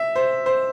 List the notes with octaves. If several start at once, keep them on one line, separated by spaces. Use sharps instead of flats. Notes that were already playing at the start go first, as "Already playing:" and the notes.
Already playing: E5
C5
C5